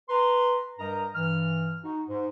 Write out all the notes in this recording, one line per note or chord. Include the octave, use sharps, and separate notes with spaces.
B4 A#5 C6
G2 G3 A#4 D#5 A#5
G2 E3 F6
D#4 F#4
G#2